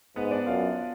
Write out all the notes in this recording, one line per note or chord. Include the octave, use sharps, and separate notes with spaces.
G#2 B3 B4
D4 D5
F#2 F4 F5